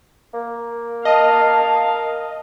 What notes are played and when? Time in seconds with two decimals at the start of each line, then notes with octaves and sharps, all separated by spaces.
0.34 A#3
1.05 A#4 D#5 F5 A5